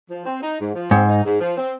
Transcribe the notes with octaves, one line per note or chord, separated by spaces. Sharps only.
F3
C4
D#4
G#2
F3
G#2 C4
D#4
G#2
F3
C4